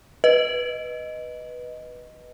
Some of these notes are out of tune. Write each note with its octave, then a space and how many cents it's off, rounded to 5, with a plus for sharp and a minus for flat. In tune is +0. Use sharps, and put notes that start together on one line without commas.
B4 -5 D#5 +0